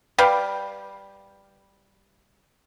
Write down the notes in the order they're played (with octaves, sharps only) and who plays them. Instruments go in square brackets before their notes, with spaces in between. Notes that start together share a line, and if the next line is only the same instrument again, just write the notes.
[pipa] G3 B4 F5 G5